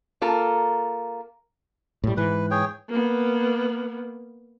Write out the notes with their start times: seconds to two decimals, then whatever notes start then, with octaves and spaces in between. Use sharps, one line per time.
0.21 A#3 F4 A4 A#4
2.04 A2 G3
2.17 G#2 E3 B4
2.51 G#4 C#5 G5
2.89 A#3 B3